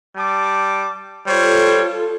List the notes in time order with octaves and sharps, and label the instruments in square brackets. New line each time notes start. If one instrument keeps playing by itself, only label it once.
[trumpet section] G3 A5 D6
[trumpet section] G3 C5 C#5 [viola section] F4 A4